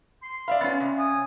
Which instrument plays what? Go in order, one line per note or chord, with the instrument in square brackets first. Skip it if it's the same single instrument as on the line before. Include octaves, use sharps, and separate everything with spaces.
[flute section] C6
[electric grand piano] D5 E5 B5 [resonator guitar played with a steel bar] F5
[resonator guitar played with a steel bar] B3 F4 [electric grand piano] C#4 A6
[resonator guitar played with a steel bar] C3
[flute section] G#5 D#6